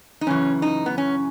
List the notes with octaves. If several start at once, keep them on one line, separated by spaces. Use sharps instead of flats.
D#4
F#2 C#3 E3 C#4
D#4
B3
C#4